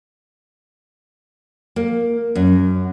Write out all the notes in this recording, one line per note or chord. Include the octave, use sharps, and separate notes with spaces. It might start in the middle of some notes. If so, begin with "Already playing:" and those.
A#3
F#2